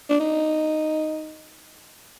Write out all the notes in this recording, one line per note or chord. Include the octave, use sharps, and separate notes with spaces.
D4
D#4